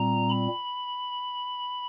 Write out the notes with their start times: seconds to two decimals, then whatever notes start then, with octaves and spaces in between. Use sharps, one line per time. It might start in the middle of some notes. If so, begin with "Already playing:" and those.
Already playing: A#2 G3 C4 A#5
0.29 B5